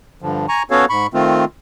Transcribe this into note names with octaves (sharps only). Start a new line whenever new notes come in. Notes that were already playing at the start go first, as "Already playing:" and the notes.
G2 D3 F3
G#5 A#5 C#6
B3 C#4 F#4 A4 C#5 F5
G#2 B5 C#6
D#3 A3 C4 F4